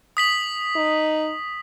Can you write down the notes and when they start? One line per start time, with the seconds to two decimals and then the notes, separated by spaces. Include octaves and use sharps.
0.17 D#6 B6 F#7
0.76 D#4